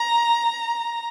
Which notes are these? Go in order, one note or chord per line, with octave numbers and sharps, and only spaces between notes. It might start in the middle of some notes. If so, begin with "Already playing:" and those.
Already playing: A#5